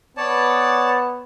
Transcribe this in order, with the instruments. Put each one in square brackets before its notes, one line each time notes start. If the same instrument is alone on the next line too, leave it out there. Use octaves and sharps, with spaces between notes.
[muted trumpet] B3 [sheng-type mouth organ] C#5 D5 A5